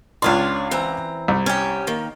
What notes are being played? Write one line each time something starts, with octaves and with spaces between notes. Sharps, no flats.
C#2 D4 F4 C#5 D5 C6
E3 C4 A#5
C2
C#4 G4
D#3 A#3